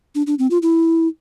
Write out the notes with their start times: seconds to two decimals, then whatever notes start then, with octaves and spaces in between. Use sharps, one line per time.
0.15 D4
0.27 D4
0.39 C4
0.51 F4
0.62 E4